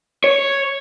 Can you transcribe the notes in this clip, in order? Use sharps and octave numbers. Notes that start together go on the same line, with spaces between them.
C#5